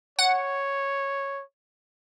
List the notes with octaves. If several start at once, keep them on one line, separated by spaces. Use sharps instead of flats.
C#5 F#5